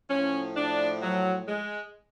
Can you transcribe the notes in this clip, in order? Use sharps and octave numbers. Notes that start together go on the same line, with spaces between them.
A2 F3 C#4
D4
F#3
G#3